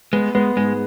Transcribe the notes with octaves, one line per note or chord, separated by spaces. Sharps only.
G#3 B3
G#3 B3
G#2 G#3